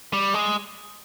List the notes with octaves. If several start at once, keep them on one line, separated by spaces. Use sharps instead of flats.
G3
G#3